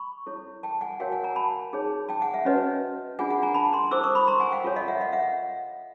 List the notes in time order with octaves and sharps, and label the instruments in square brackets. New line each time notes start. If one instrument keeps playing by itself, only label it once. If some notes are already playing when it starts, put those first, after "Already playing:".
Already playing: [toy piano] B5 C#6
E4 A4 C#5
G5 A5
F#5 G#5
F#4 A#4 C#5 F5 G5
F#5 G#5
G#5 A#5
A5 B5
D#4 G#4 C#5
G5 A5
F#5 G#5
E5 F#5
C#4 F#4 B4 C#5 D#5
D4 F4 G#4 F#5 G#5
F#5 G#5
G#5 A#5
A5 B5
A#5 C6
E4 A4 C5 D6 E6
C#6 D#6
B5 C#6
A#5 C6
F#5 G#5
F5 G5
F4 A4 C#5
D#5 F5
E5 F#5
D#5 F5
E5 F#5